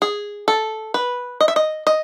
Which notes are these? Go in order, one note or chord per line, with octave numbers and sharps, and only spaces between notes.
G#4
A4
B4
D#5
E5
D#5
D#5